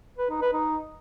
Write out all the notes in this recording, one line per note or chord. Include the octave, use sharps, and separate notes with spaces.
B4
D#4
B4
D#4